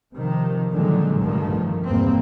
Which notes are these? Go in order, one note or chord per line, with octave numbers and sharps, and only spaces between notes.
C3 D#3 F3
A#2 D3 D#3 F3 F#3 G#3
G2 C3 D#3 F3 A3
E2 G2 B2 A#3 C4